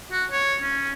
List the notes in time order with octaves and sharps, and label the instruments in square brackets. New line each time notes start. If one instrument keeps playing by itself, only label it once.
[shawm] F#4
C#5
C#4